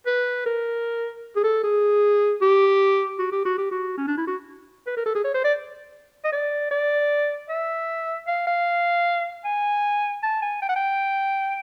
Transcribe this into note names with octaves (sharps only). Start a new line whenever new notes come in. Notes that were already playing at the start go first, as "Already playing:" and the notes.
B4
A#4
G#4
A4
G#4
G4
F#4
G4
F#4
G4
F#4
C#4
D4
E4
F#4
B4
A#4
A4
G#4
C#5
C5
D5
D#5
D5
D5
E5
F5
F5
G#5
A5
G#5
G5
F#5
G5